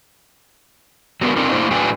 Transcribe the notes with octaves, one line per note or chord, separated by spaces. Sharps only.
F#3 G#3 B3 D4 A#4
C4 D4 D#4 F4 A#4
A3 A#3 D4 E4 C5
A2 F#3 D4 G#4 B4 G5